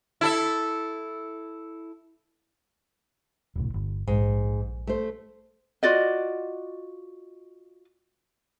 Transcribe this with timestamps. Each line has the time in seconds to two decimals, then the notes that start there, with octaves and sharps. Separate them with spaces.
0.21 E4 A4 E5
3.56 E1 C2 A2
3.74 G1
4.07 A#1 G#2
4.87 A3 C5
5.83 F4 F#4 D5 D#5